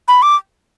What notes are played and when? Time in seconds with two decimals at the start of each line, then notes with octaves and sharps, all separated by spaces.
0.08 B5
0.22 D6